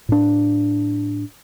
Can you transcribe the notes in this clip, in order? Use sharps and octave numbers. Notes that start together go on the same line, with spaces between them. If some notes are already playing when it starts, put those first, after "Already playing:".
A2 D4